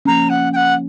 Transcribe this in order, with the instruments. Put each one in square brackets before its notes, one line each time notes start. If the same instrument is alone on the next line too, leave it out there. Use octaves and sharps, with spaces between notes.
[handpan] F3 A#3 C#4 [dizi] A#5
[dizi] F#5
G5
F#5